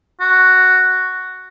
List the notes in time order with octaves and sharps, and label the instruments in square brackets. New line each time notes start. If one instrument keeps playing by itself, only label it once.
[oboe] F#4